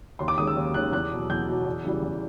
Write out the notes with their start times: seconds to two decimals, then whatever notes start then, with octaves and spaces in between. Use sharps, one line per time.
0.19 D#2 C6
0.28 D6
0.38 D#3 G#3 C#4 D#6
0.47 E6
0.57 D#2
0.74 D#3 G#3 C#4 F#6
0.92 E2 F#6
1.11 B2 F#3
1.30 E2 G6
1.48 B2 F#3
1.65 E2
1.84 C#3 E3 G3
2.03 E2